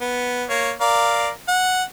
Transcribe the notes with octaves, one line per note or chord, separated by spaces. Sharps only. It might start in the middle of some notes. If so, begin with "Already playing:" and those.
B3
A#3 C#5
A#4 D5 F5
F#5